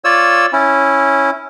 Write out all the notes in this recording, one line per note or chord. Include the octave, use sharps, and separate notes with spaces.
F4 C#5 D5 E6
C#4 E4